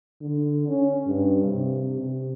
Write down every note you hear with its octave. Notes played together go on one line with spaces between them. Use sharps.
D3
C#4
G2
C3
C3